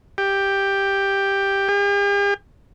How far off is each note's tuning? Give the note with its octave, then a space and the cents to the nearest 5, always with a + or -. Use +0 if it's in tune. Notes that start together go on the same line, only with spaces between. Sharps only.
G4 +5
G4 +45